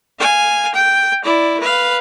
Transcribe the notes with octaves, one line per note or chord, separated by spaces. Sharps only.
F5 G#5
G5
E4 D5
B4 F5